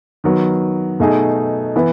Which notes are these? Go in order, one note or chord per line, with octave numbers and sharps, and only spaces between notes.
D#3 F#3 B3
B2 A3 D#4 G#4
E3 B3